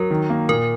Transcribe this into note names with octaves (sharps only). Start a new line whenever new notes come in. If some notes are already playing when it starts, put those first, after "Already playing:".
Already playing: F#3 A#4
D#3
A#3
A#2 A#4